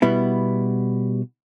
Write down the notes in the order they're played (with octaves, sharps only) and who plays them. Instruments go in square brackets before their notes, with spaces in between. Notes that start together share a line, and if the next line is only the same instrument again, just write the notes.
[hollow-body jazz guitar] B2 G3 B3 E4